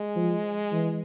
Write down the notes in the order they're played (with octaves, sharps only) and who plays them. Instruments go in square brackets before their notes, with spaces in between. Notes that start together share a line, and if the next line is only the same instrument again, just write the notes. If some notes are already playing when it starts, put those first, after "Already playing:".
Already playing: [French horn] G#3
[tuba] F3
E3